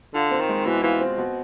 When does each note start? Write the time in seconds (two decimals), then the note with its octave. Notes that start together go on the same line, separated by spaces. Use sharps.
0.14 D3 F4
0.31 C4
0.40 D#3
0.49 G#3
0.66 B2 E3
0.83 E3 F4
1.01 C4
1.18 B2